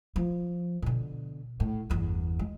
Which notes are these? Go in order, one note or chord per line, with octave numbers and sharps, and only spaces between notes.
F3
B2 D3
A2
G1 E2
G#3